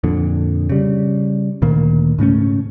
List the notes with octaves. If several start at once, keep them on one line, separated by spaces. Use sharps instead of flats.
F2 A#2 D3
C#3 G3
D2 A#2 D#3 A#3
G#2 C#3 A3 C#4